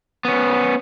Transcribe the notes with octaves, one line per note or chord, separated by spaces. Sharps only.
B3 C#4